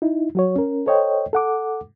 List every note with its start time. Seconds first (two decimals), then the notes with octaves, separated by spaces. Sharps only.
0.02 D#4 E4
0.35 F#3 F#4 C#5
0.56 C#4 A#4
0.86 A4 C5 C#5 D#5 G5
1.33 A4 F#5 D6